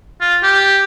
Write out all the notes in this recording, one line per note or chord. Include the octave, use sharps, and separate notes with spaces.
F4
G4